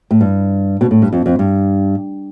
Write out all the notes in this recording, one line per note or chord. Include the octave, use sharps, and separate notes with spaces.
A2
G2
B2
A2
G2
F2
F2
G2